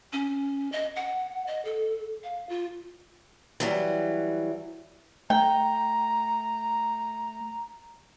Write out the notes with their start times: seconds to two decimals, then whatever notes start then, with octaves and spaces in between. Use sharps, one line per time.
0.13 C#4
0.72 D#5
0.96 F#5
1.47 D#5
1.65 A4
2.23 F5
2.49 F4
3.60 E3 F#3 G3
5.30 A3 G5 A#5